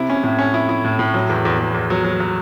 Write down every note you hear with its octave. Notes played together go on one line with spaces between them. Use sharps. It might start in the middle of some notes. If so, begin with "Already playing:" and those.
Already playing: C3 E4
C#4
A2
C#4
E4
E4
A2
A2
F#3
E2
E2
E2
E2
F#3
F#3
F#3